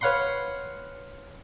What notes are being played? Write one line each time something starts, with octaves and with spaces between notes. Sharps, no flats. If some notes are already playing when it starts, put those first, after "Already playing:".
B4 C#5 F5 F#5 B5 C6